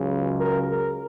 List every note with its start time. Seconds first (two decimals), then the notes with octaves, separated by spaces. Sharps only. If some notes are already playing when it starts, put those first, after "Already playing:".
Already playing: C#2 C#3 F#3
0.36 A#4
0.67 A#4